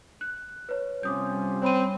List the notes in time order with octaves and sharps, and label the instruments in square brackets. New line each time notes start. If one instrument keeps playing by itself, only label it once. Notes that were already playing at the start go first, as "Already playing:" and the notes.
[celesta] F#6
B4 C#5
[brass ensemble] C3 F3 C#4 [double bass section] G3 [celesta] D6 D#6 G6
[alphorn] C4 [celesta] C#5 B5 D#7